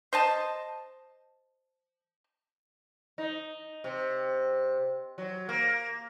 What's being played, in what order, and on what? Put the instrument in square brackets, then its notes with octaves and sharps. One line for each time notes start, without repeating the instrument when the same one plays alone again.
[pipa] C5 D#5 A5
[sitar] D#4
C3
F#3
A#3